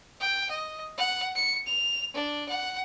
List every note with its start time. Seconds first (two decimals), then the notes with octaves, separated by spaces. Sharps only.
0.20 G5
0.50 D#5
0.97 F#5
1.35 C#7
1.67 F7
2.14 D4
2.49 F#5